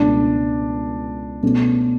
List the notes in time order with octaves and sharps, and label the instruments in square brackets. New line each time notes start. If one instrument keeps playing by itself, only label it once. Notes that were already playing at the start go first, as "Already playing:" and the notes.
Already playing: [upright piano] C#2 B2 A3 [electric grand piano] D4
[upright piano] B2 A3 C#4